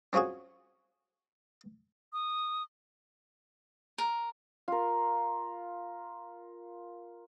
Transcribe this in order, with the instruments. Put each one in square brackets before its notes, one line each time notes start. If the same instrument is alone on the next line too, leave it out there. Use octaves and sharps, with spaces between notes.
[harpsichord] C4 C#4 F4 F#4 G#4
[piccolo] D#6
[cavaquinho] A#4
[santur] F4 A#4